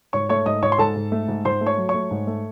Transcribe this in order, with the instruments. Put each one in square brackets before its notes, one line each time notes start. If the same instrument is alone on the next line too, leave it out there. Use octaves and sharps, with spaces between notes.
[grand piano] G#2 C#5 C#6
A3 C#5 C#6
G#2 D#5 D#6
G#2 C#5 C#6
C6
G#2 A4 A5
G#2
A3
G#2
G#2 C5 C6
A3
C#5 C#6
F#3
C#5 C#6
A3
G#2
A3